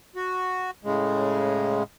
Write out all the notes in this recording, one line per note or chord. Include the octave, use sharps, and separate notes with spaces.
F#4
A2 C#3 G#3